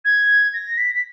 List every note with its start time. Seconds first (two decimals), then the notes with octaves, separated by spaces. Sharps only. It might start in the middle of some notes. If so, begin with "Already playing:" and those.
0.05 G#6
0.53 A#6
0.78 B6
0.95 B6